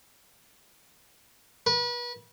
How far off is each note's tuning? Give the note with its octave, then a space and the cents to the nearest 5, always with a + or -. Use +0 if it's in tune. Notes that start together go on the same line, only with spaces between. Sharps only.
B4 -35